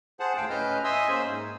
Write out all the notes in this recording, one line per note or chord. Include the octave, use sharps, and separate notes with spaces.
G#4 C5 F#5 A5
D2 A2 F5 G5 A5
A2 C#4 B4 D#5 F6 G6
D#5 E5 G#5 C6 D#6 E6
A#3 C#4 G#4 C5
G#2